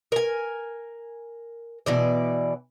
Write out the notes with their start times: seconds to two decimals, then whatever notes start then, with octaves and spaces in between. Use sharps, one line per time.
0.12 A#4 G#5
1.86 B2 E3 D5